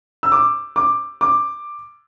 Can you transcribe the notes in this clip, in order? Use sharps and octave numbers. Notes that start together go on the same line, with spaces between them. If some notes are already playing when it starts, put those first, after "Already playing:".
E6
D6
D6
D6